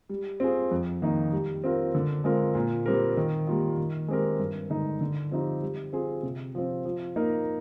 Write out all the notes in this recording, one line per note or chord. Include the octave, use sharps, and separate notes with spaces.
G3
C4 F4 G#4
F2
D#3 A#3 D#4
G3
C4 F4 A#4
D3
G#3 C4 F4 A#4
A#2
G3 C4 G4 A#4
D#3
G3 A#3 F4
D#3
G#3 C4 G4 A#4
G2
D3 G#3 D#4
D3
F3 C4 D#4 G4
G3
C4 F4 G#4
C3
F3 C4
F3
A#3 D#4 A#4